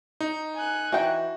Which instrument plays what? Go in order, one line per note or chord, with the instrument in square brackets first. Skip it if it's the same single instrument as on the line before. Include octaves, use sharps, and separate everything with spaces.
[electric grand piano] D#4
[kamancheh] G#5 F#6
[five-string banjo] E3 D#4 G5 [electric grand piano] F#4